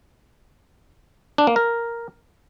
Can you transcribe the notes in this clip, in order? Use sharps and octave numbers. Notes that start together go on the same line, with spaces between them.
D4
A#3
A#4